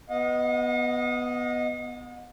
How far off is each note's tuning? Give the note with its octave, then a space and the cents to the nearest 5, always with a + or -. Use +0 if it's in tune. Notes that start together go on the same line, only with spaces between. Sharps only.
B3 +0 D#5 +0 F#5 -45